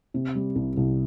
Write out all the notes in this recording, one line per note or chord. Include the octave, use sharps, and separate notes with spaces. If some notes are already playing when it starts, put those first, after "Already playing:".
C3
G3
C2
C2